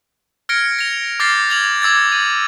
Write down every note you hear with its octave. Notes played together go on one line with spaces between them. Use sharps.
F6 G#6 A#6 C#7 D7
A#6 F7
D6 F6 G6 A6 A#6 C7
F6 G#6 F7 F#7
D6 E6 G#6 A6
A6 D#7